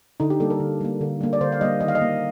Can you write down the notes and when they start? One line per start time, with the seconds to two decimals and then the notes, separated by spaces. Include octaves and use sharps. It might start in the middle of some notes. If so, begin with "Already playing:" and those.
0.20 D3 D#4
0.30 G4
0.40 G3 A#3 A4
0.50 A#4
0.60 D3
0.81 G3 A#3
1.01 D3
1.21 G3 A#3
1.33 D5
1.41 D3 C5
1.52 F5
1.61 G3 A#3 D#5
1.81 D#3 D#5
1.88 F5
1.95 D#5
2.01 A#3